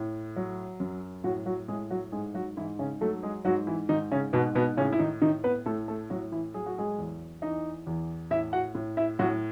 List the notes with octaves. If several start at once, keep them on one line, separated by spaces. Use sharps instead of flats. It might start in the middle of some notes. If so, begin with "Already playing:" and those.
Already playing: A2
F#3
F#2
A2 F#3 F#4
F#3 F#4
A2 G#3 G#4
F#3 F#4
G#2 G#3 G#4
F#3 F#4
G#2 E3 E4
C#3 C#4
F#3 A3 A4
G#3 G#4
G#2 F#3 F#4
E3 E4
G#2 D#3 D#4
C#3 C#4
G#2 B2 B3
B2 B3
A2 C#3 C#4
E4
D#3 D#4
A2 D#3 D#4
B3 B4
A2 A3 A4
A3 A4
A2 F#3 F#4
E3 E4
F#3 G#4
F#4
G#3 G#4
E2
E3 D#4 D#5
E2
A2 E4 E5
F#4 F#5
A2
E4 E5
A2 F#3 F#4